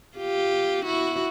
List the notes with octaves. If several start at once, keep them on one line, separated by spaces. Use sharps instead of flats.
F4 G4
E4 F#4